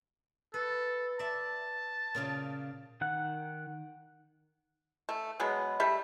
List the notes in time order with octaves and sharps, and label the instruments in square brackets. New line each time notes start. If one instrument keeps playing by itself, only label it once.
[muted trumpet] A4 [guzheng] B4
[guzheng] D5 E5 [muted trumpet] A5
[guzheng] A#2 C#3 F4
[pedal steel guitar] D#3 F#5 F#6
[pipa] A3
B2 F#3 G#3 B3
G3 A3 G4 E5